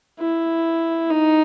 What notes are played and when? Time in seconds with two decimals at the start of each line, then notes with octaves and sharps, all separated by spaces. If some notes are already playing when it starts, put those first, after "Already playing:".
0.20 E4
1.11 D#4